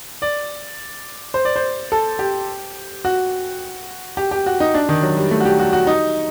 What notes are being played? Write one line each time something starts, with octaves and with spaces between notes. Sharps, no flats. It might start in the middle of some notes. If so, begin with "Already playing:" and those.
D5
C5
D5
C5
A4
G4
F#4
G4
G4
F#4
D#4
D4
D#3
F#3
G3
A3
F#4
G4
F#4
F#4
D#4